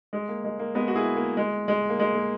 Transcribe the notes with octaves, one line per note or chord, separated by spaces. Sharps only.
G#3
A#3
G#3
A#3
G#3 B3
F#4
E4 G#4
A#3
G#3
G#3
A#3
G#3
A#3